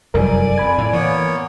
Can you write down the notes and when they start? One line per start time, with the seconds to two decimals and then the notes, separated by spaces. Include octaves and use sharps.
0.14 F1 F#2 G3 A#4 D5 G#5
0.58 F2 B5 G#6
0.78 A2
0.93 E3 A#3 B3 C#5